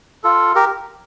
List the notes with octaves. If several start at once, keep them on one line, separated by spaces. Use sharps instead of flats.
F4 A4
G4 A#4